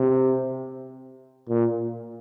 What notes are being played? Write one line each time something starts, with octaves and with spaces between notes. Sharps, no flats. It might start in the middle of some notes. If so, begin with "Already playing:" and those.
Already playing: C3
A#2